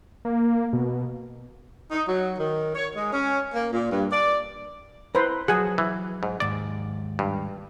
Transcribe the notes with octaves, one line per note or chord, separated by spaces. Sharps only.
A#3
B2
D#4
F#3
D#3
C#5
G#3
C#4
A#3
A#2
G2
D5
E4 B4 C5 A#5
F3 F#3 F#4 G#4 F#5 G#5
E3
G#2
D#2 G#2 D5
G2